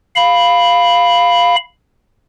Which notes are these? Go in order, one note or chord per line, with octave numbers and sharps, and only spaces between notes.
F5 B5